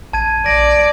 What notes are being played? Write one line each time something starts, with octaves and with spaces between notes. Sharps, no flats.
A1 A5 G#6 D#7
A#1 D5 A#6